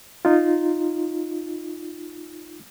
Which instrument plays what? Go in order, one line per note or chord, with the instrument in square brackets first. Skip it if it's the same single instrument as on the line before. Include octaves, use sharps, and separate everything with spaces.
[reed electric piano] D#4 F4